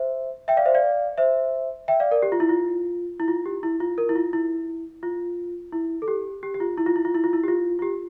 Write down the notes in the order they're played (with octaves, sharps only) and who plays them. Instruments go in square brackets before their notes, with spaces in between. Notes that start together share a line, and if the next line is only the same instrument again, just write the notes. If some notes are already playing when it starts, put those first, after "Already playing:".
Already playing: [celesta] C5 E5
E5 G5
D5 F5
C5 E5
D5 F5
C5 E5
E5 G5
D5 F5
A#4 D5
G4
F4
E4
F4
E4
F4
G4
E4
F4
A#4
E4
F4
E4
F4
E4
A4
G4
G4
G4
F4
E4
F4
E4
F4
E4
F4
E4
G4
F4
F4
G4